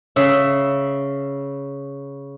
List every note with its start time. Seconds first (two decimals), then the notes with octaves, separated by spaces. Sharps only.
0.16 C#3 E5